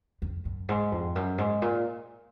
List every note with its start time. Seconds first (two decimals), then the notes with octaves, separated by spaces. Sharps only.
0.22 F2
0.45 F#2
0.69 G#2
0.92 F2
1.15 F#2
1.38 G#2
1.62 A#2